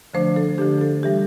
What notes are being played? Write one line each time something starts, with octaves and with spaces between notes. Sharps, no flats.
D3 F3 A3 D4 C5
A4
D3 F3 A3 D4 G4
A4
E3 G3 G4